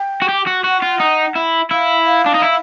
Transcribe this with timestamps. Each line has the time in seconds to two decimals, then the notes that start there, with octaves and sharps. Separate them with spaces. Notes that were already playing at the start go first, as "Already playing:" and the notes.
Already playing: G5
0.22 F#4
0.29 G4
0.47 F#4
0.64 F#4 F#5
0.82 F4
1.00 D#4
1.36 E4
1.71 E4 F5
2.06 F5
2.26 D4
2.34 D#4
2.42 E4